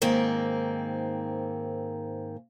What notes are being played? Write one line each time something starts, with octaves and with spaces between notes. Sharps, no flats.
G#2 D#3 A#3 C4